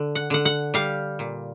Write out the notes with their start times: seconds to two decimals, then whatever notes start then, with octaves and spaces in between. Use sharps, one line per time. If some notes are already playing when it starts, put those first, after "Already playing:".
Already playing: D3
0.15 F#5
0.30 D3 F#5
0.45 F#5
0.74 G3 F5
1.19 A#2